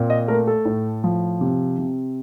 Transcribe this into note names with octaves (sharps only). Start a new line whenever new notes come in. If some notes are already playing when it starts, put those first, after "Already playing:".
Already playing: A#2 C4
D#5
A3 A#4
A4
A2
F3
C3
C3